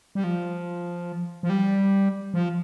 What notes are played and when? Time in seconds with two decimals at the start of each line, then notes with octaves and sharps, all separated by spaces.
0.15 G3
0.24 F3
1.43 F3
1.50 G3
2.34 F3